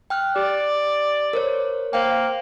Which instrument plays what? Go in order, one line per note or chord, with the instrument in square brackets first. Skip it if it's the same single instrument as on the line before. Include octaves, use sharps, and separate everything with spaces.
[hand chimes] G5 F6 F#6
[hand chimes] G4 [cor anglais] D5
[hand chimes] A#4 C5 C#5
[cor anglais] A#3 [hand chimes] C5 F5 G5